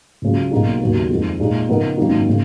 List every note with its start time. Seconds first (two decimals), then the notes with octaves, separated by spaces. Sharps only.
0.22 C#2 C#3 F#3
0.51 B1 B2 A#3 D#4 G#4
0.81 D#2 C#3 F#3 B3
1.10 F2 D#3 G#3
1.40 A#2 G#3 D#4
1.69 C#3 F3 B3 D#4 A#4
1.98 G#1 F#2 D#3 A#3 D#4
2.29 C#3